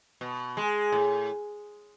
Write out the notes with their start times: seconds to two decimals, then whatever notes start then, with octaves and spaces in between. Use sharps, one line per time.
0.21 B2
0.57 G#3
0.92 A2